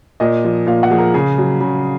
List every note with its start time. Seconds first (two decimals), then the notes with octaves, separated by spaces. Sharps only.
0.20 A#2 D#5
0.44 F3
0.67 A#2 F5
0.83 F#5
0.91 F3 G#4
0.98 A#4
1.14 C#3 G#4
1.38 F#3
1.61 C#3